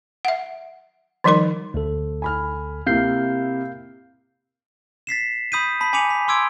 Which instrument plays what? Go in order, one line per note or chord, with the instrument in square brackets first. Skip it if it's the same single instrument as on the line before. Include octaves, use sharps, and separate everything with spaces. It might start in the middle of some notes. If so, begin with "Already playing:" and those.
[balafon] E5 F#5
D#3 F3 G3 D#4 A#4 C6
[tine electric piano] D2 A4
[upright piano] G#5 B5 F6
[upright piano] C3 A#3 E4 [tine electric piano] F5 G6 C7
[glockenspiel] A6 B6 C7 E7
B5 D#6 G6 B6 D#7
A5 B5 B6
G#5 B5 D6 C#7 D#7 F7
B6 F7
C6 D6 E6 G#6 D7